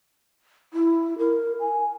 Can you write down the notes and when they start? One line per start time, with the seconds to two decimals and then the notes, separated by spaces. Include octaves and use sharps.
0.74 E4
1.19 A#4
1.60 G#5